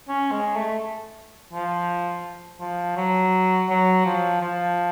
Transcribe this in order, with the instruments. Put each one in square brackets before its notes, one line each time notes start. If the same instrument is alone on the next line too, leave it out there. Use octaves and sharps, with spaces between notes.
[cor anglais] C#4
G#3
A3
F3
F3
F#3
F#3
F3
F3